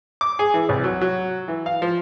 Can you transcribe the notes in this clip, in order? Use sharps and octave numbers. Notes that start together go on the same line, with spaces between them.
D6
G#4
E3
C2
F#3
F#3
E3
F5
F3